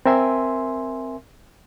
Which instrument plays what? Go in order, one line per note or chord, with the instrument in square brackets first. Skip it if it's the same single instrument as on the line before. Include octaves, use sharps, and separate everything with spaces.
[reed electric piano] C4 A#4 E5 G#5 C6